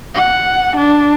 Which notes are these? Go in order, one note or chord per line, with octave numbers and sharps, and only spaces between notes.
F#5
D4